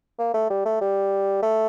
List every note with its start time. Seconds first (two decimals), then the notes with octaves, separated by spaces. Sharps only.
0.19 A#3
0.34 A3
0.50 G3
0.66 A3
0.81 G3
1.43 A3